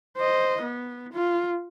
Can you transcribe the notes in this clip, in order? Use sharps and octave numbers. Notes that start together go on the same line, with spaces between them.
C5 D#5
B3
F4